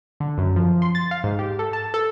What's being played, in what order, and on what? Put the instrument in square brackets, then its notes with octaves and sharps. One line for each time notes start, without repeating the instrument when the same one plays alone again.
[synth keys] D3
F#2
F3
C6
A6
F5
G#2
G4
A4
A5
A4